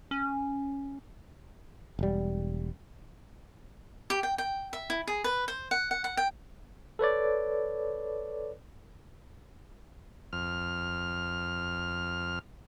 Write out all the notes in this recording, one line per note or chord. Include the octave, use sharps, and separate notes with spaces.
C#4
E1 G3
G4
G5
G5
E5
E4
G#4
B4
C5
F#5
F#5
F#5
G5
A4 B4 C#5 D5
F2 F6